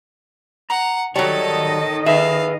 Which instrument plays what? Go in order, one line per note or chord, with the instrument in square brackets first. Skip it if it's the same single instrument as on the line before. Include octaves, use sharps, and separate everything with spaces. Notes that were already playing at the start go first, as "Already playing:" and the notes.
[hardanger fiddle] F#5 [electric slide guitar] A#5
[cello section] D#3 D#5 [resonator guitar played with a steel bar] F#3 G3 [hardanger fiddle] A4 A5 [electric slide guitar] C#5
[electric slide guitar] G#4 B4 [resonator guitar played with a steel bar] E5 [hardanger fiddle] F5